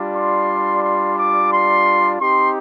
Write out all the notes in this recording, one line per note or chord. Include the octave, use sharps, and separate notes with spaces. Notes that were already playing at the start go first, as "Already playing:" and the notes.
Already playing: G3 D4 F4
C6
C6
D6
C6
C4 D#4 G4 C6